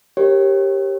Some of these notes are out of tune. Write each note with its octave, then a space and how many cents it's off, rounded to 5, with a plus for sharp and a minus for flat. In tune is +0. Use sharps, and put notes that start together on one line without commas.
G4 +0 A#4 +0 C#5 -35